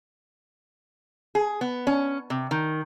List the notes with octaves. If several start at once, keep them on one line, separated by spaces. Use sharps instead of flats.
G#4
B3
C#4
C3
D#3